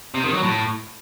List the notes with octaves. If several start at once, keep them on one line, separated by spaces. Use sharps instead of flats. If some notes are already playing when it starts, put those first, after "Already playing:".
C3
D#3
F#3
A2